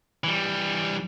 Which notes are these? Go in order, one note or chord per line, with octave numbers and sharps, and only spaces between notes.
E3 G3